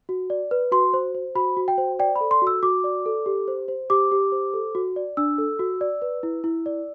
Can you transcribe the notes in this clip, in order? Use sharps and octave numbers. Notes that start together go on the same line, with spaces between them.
F#4
D5
B4
F#4 C6
C5
C5
F#4 B5
F#4
G5
C5
D5 G5
B5
A4
C6
F#4
E6
F#4 D6
D5
A4
G4
C5
C5
G4 D6
G4
C5
A4
F#4
D5
D4 E6
A4
F#4
D5
B4
E4
E4
D5